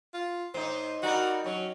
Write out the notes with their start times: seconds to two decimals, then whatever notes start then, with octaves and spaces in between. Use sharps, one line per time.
0.14 F4
0.54 A2 D#4 C5
1.03 G3 D#4 F#4 A#4
1.46 F#3 C#4